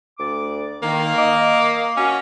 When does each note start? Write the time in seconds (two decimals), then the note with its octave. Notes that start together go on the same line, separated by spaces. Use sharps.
0.18 D2 D5 D6
0.82 D#3 A#3
1.16 D#5 D6
1.97 C#4 F#4